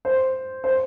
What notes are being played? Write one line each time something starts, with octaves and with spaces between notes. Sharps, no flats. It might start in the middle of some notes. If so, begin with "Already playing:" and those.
C5
C5